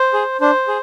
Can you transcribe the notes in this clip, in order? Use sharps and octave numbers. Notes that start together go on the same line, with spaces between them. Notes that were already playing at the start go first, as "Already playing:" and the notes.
Already playing: C5
G#4
D4 C5
G#4